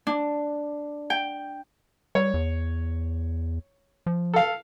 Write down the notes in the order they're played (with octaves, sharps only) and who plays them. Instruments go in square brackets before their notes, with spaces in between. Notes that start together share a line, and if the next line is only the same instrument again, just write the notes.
[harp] D4
G5
[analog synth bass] G3 [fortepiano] C#5
[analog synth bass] E2
F3
[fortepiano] A4 F5